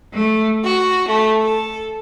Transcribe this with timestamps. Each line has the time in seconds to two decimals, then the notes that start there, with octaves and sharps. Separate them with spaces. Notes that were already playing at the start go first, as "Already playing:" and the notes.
0.13 A3
0.64 F#4
1.08 A3
1.43 A4